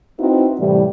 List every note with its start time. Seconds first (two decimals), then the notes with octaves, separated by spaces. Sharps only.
0.19 C4 D#4 E4 F#4 B4
0.59 A2 C3 E3 G3